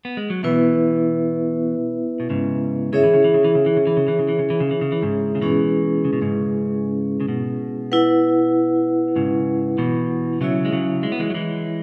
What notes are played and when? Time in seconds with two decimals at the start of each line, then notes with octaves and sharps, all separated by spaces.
0.05 B3
0.17 G#3
0.30 F#3
0.43 B2 E3 B3 E4 B4 E5
2.20 B2
2.30 G#2 C#3
2.93 C#3 E4 G#4 C#5 E5
3.04 E3
3.14 C#3
3.24 E3
3.34 C#3
3.44 E3
3.55 C#3
3.66 E3
3.77 C#3
3.87 E3
3.97 C#3
4.08 E3
4.19 C#3
4.29 E3
4.39 C#3
4.50 E3
4.60 C#3
4.71 E3
4.81 C#3
4.92 E3
5.02 G#2 C#3
5.35 C#3
5.41 B2 E3 G#3 C#4 E4 G#4 B4
6.05 C#3
6.13 B2
6.21 G#2 C#3
7.20 C#3
7.28 B2
7.92 E4 B4 F#5
9.16 G#2 C#3
9.78 B2 E3
10.41 C#3 F#3 E4 C#5 E5
10.65 G#3
10.72 C#3 F#3
11.03 G#3
11.12 B3
11.20 E3 G#3
11.30 F#3
11.35 E3 G#3